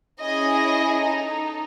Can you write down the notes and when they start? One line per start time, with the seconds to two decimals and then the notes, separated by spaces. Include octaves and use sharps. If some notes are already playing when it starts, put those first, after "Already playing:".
0.20 C#4 E4 G#4 D#5
1.02 D#4 A4